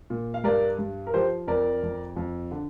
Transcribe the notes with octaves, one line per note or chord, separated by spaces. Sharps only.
A#2
F5
G2 A#4 D5
G2
A#4
F3 G4 C5
F2 A#4 D5
F2
F2
D3